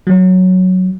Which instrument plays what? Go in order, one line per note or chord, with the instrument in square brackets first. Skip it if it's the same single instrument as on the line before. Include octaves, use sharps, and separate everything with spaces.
[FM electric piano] F#3